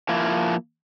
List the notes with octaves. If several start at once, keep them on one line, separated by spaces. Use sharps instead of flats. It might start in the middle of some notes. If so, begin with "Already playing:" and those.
F3 A#3 E4